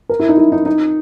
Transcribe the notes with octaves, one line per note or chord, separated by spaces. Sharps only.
A#4
E4
D#4
E4
D#4
D#4